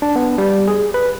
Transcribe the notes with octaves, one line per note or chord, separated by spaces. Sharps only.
D4
B3
G3
G#4
B4